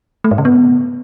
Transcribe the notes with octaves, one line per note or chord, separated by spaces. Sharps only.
A3
G#2
C#3
B3